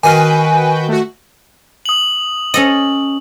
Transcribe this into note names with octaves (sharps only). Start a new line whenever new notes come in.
D#3 F#4 B4 D#5 F5 G5 G#5
A3 F#4
D#6 F#7
C#4 A4 D#5